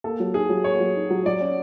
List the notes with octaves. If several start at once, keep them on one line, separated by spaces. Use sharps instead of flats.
A#3 A4
F#3
D#4 G#4
F#3
A#3 C#5
F#3
D#4
F#3
F#3 D5
C#4